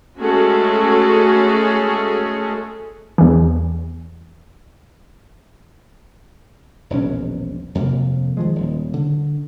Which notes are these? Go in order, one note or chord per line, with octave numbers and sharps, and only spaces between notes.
G#3 A3 C#4 F#4 G#4 A4
E2 E3
E1 A#1 F#3 C#4
F2 C3 A#3
D#3 F3 G#3
D#1
D3